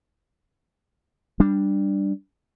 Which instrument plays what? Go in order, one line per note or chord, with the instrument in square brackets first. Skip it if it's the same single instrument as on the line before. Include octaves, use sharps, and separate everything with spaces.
[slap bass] G3 D4